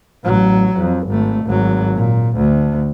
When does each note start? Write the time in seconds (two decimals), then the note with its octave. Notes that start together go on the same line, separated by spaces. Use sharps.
0.24 A1 F#3
0.77 F2
1.08 G#1 A3
1.45 G#1 F#3
1.96 A#2
2.37 D2